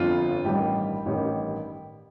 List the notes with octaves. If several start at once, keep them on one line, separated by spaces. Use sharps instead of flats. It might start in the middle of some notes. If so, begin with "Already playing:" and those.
Already playing: G1 F2 D3 F4
A1 G2 D#3 G3 G4
A1 G2 D#3 G3